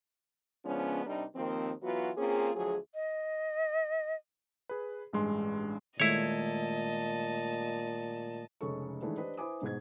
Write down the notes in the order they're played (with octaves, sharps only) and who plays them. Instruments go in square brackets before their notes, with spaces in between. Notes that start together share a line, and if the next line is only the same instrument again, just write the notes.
[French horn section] C#3 F3 G#3 B3 C#4 D4
C3 G3 D4 D#4 A#4
D#2 D#3 F3 A#3 C4
E3 F#3 B3 F4 F#4 B4
A#3 C4 C#4 F4 G#4
D2 F3 F#3 G#4
[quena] D#5
[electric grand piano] G#4 B4
A1 G2 G#3 C6
[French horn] A#2 [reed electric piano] D#3 G#3 A3 [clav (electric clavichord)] E4 C#5 [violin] D#5 A5
[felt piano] F1 C#3 G#3 A4 C#5 C#6
D#3 E3 G#3 A3 D4 E4
D4 G4 B4 C5 D#5
E4 B4 C5 G#5 D6 D#6
G#2 B2 G#4 C5 G#6